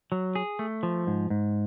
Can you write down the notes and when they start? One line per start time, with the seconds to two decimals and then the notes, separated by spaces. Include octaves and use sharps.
0.12 F#3
0.35 G#4
0.59 A3
0.83 F3
1.07 G#2
1.30 G#2